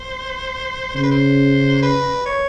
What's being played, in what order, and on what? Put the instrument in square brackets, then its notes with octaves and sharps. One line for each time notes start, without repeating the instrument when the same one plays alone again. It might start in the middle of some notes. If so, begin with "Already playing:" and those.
Already playing: [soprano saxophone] C5
[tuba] C#3 [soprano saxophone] C5
[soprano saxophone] B4
C5
B4
C#5